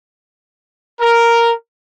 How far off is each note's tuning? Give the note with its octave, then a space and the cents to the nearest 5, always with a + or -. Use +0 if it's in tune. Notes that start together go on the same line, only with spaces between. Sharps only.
A#4 +0